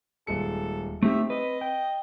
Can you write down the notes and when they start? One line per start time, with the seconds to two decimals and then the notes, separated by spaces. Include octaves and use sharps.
0.27 D#1 G#3 A4 C#7
1.03 A3 C4 D#4 G4 E5
1.30 B4 D#5
1.61 G5